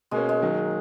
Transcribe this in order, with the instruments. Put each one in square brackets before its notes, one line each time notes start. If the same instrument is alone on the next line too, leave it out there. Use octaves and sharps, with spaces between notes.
[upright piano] B2 A#3 C#4 [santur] G#3
[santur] G#3
[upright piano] D#3 F#3 A#3